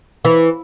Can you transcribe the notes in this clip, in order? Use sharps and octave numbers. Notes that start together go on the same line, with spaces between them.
E3